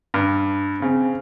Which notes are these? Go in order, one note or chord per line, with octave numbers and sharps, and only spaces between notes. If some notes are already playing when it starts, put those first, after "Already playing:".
G2
C#3 C4